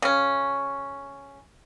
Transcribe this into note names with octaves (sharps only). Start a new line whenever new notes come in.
C#3 C#4